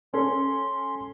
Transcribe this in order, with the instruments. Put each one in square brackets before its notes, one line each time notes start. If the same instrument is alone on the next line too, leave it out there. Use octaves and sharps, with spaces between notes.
[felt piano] C#4 A4 [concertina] C6